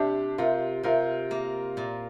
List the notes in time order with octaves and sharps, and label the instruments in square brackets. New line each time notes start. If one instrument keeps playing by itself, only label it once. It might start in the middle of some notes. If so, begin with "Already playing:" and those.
Already playing: [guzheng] C3 [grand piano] D4 G4
[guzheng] C3 [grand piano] F4 A#4
[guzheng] C3 [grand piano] F4 A#4
[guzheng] A#3
A#2